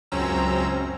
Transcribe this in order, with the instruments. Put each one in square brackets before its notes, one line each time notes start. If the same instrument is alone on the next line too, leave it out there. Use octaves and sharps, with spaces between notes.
[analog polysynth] C#2 F#2 C4 C#4 A#5 E6